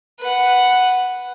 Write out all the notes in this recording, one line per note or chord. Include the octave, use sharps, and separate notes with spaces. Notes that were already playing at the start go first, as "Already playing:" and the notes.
B4 F#5